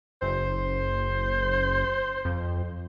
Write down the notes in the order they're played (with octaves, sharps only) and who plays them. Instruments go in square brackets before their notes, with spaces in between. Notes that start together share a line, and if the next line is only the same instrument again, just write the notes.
[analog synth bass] F#1 [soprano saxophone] C5
[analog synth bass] F2